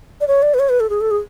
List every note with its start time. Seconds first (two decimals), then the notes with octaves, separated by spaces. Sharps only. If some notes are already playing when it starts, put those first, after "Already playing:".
0.21 D5
0.28 C#5
0.42 D5
0.54 B4
0.59 C#5
0.69 B4
0.80 A4
0.90 G#4
1.01 A4
1.11 G#4